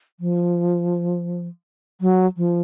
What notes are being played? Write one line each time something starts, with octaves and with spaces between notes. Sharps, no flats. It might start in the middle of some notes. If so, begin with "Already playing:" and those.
F3
F#3
F3